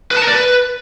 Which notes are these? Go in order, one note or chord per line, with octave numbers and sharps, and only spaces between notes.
B4
A5
A#4
D5
B4